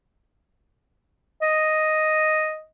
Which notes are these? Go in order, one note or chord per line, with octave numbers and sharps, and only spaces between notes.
D#5